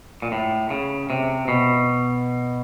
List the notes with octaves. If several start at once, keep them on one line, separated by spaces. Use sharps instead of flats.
A#2
A2
C#3
C3
B2